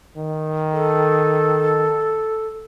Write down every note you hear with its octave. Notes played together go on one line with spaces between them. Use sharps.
D#3
A4